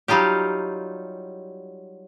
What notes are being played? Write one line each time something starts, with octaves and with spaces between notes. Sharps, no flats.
F#3 G3 D#4 F4 G4